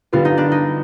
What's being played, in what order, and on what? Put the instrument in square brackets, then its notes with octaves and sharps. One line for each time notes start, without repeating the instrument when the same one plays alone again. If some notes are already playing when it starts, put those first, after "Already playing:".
[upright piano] G2 D3 G3 B3 [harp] F4
[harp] D#4
D4
D#4